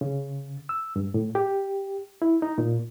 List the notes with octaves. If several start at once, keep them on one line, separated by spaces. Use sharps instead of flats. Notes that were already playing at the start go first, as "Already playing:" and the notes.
C#3
E6
G2
A2
G4
E4
D#4
A#2